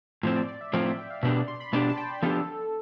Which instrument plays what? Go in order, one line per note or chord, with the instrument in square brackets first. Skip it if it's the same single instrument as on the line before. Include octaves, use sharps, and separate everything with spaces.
[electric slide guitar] A2 F3 C4
[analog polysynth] D5
D5
E5
[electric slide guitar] A2 F3 C4 [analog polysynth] D5
[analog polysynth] E5
G5
F5
[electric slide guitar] B2 B3 D4 G4 [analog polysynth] E5
[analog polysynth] D5
C6
B5
[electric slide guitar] B2 B3 D4 G4 [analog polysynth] A5
[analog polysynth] A5
G5
[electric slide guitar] F3 B3 D4 G4 [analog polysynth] A4